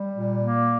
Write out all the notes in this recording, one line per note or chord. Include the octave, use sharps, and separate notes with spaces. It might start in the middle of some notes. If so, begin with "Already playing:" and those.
Already playing: G3
A#2
A#3